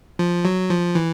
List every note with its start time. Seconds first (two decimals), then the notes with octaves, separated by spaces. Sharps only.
0.19 F3
0.45 F#3
0.70 F3
0.95 E3